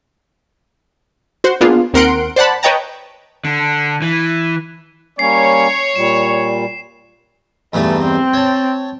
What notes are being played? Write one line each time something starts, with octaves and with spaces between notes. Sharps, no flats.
F#4 C5
A#3 B3 D4 F4 G#4
D#2 C4 A#4 F#5 C6 D7
C5 D5 F#5 A5 B5
B4 C#5 D#5 G5 A5 A#5
D3
E3
G3 A#3 C#4 C#5 C7
A#2 G3 E7
E2 G2 A3 D#4
C4
C#5 A5